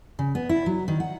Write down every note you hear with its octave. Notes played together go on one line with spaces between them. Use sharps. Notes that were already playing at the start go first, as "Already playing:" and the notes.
C#3
B3
E4
F#3
D#3
F#5